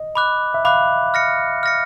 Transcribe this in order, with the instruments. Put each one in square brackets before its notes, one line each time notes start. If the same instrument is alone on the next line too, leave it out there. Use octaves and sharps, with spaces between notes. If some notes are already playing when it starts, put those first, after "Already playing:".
Already playing: [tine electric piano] D#5
[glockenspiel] B5 D6 F#6
[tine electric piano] E5
[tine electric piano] F5 [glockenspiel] B5 D6 F#6
[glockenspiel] F6 A#6 C#7
F6 A#6 C#7